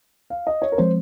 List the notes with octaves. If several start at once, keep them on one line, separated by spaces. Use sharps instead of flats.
F5
D#5
C#5
A#4
F3 G#3 C4 C5